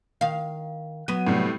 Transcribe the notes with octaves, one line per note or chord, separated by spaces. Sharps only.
D#3 F5
F#3 B3 D#7
A2 C3 G3